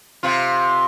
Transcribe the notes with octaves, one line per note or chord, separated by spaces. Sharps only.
C3 F4